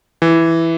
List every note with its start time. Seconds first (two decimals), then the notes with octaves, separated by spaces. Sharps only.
0.22 E3